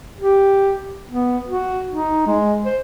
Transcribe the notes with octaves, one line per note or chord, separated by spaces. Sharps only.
G4
B3
F#4
D#4
G#3
C5